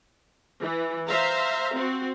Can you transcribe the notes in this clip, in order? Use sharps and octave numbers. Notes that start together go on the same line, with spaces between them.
E3
C5 E5 F5 A#5
C4 F#4